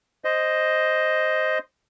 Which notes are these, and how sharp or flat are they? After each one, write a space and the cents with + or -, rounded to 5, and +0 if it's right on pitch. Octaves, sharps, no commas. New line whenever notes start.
C5 +0 D#5 +0